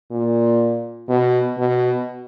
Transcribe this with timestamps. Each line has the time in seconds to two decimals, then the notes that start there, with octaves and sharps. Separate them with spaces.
0.11 A#2
1.09 B2
1.58 B2